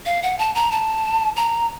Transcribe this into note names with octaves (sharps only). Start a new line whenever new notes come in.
F5
F#5
A5
A#5
A5
A#5